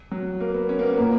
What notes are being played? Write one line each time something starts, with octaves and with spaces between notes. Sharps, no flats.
F#3
A#3
B3
C#4
A#3
B3
A#2 A#3 B3